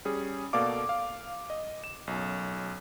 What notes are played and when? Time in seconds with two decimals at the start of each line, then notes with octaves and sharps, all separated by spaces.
0.05 G3 C#4 G#4
0.53 B2 A#3 A4 D5 F5 D6
0.89 F5
1.50 D#5
1.84 E7
2.07 B1 F#2